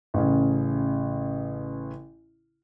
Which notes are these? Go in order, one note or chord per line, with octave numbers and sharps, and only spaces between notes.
A1 C#3